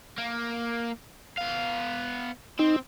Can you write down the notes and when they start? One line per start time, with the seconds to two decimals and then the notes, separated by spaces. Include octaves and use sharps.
0.18 A#3
1.38 B3 F5
2.59 C4 D#4